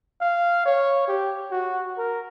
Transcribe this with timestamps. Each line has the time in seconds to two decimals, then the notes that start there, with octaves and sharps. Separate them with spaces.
0.21 F5
0.66 C#5
1.08 G4
1.51 F#4
1.98 A#4